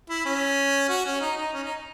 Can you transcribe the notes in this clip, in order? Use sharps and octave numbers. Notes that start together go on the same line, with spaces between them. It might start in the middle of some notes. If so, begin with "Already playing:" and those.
E4
C#4
F#4
C#4
D#4
D#4
C#4
D#4